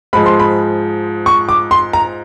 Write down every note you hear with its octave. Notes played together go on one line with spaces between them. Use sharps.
G#2 F3 G#3 B5
C6
B5
C#6
D6
C6
A#5